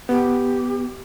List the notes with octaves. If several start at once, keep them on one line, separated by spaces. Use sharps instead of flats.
B3 G4